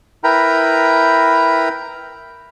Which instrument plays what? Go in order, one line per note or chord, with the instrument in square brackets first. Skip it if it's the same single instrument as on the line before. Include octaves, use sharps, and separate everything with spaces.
[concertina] E4 A#4 B4 G5 A#5 B5